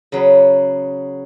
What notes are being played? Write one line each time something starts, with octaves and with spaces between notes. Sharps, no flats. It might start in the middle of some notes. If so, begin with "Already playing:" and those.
C#3 F#3 B3